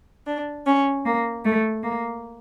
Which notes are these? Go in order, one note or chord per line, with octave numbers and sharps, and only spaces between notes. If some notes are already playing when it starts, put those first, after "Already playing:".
D4
C#4
A#3
A3
A#3